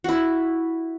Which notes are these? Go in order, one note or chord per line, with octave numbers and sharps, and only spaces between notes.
E4 F#4